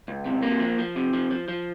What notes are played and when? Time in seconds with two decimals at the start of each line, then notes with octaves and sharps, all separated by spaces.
0.08 C#2
0.25 C3
0.42 A#3
0.60 F3
0.79 F3
0.96 C3
1.14 F3
1.31 F3
1.48 F3